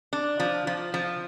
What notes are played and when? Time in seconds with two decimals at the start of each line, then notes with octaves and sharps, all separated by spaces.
0.13 D4
0.40 F3
0.67 F3
0.94 F3